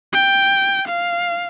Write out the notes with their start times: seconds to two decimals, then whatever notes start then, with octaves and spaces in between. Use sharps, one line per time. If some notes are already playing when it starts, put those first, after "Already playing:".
0.13 G5
0.88 F5